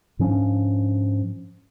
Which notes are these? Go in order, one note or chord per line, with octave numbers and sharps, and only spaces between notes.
G#2 F3 C#4 D4